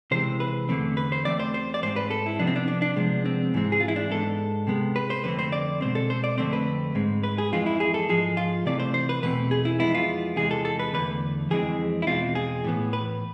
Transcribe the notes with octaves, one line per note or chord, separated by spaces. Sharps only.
C3 E3 G#3 C4 C5
B4
E2 D3 A3 C4
B4
C5
E2 D3 A3 C4 D5
C5
C5
D5
G#2 G#3 C4 C5
B4
A4
E4
C3 F3 B3 D4
C4
D4
D4
D4
C3 F3 G#3 B3
C4
G#2 E3 G#3 C4
G#4
F4
E4
D4
G#2 G#3 B3 A4
C3 G#3 B3
B4
C5
F2 D3 A3 C4 B4
C5
D5
B2 G#3 C4 C5
A4
C5
D5
F2 D3 A3 C4 C5
B4
G#2 G#3 C4
B4
G#4
F2 E3 G#3 C4 F4
E4
G#4
A4
G#2 F3 G#3 G#4
F4
C3 E3 A3 C4 D5
C5
C5
B4
E2 B2 A3 C4 B4
G#4
E4
F2 E3 G#3 B3 E4
F4
E2 C3 E3 G#3 G#4
A4
A4
B4
E2 D3 A3 B4
F2 E3 G#3 C4 G#4
E4
E2 B2 G#3 C4 F4
G#4
A2 E3 B3
B4